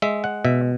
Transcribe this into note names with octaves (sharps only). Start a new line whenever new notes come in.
G#3 E5
F#5
B2 E5